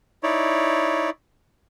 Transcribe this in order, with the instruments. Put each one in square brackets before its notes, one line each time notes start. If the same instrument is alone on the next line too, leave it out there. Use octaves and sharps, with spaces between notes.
[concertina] D#4 E4 C#5 D5